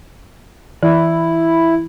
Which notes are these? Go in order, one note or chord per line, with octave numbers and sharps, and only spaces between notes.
E3 E4